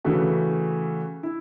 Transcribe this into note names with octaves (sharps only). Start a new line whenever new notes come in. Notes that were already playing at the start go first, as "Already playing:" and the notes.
C#3 E3 A3 F#4
E4